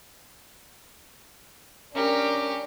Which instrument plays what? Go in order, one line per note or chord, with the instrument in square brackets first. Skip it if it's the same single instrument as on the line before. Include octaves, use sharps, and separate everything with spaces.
[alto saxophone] C#4 [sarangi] D4 [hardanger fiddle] G4 [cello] A#4